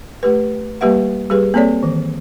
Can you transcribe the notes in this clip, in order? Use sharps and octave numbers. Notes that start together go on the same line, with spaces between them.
A3 G4 B4
G3 A#3 G4 B4 E5 F#5
G3 G4 G#4 B4
A#3 C4 A4 C#5 D5
D#3 E3